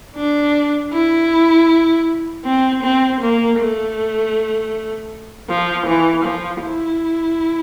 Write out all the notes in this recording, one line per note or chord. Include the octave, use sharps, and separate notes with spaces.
D4
E4
C4
C4
A#3
A3
F3
E3
F3
E4